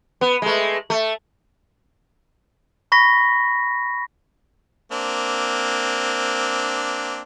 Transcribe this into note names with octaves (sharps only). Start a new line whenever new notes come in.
B3
G#3 A3
A3
B5 C#6 A#6 B6
A#3 C4 D4